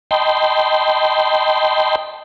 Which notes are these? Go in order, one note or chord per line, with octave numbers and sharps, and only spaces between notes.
D#5 G5 A5 B5 C6